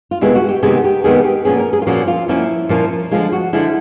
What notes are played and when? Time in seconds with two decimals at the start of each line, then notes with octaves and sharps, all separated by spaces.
0.11 F4
0.21 C3 D#3 G#3 B3 E4
0.35 F#4
0.49 G4
0.63 C3 D#3 G#3 B3 G#4
0.84 G4
1.04 C3 D#3 G#3 B3 G#4
1.24 G4
1.45 A#2 F3 A#3 C#4 G#4
1.60 A#4
1.73 G#4
1.82 F4
1.87 A#2 F3 A#3 C#4 F#4
2.07 F4
2.28 A#2 F3 A#3 C#4 E4
2.69 A#2 F3 A#3 C#4
3.11 D3 F3 G#3 F4
3.32 F#4
3.53 D3 F3 G#3 E4